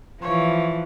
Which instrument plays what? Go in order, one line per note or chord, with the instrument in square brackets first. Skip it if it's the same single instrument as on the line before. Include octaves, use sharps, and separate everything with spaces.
[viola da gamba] E3 F3 [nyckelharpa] C#5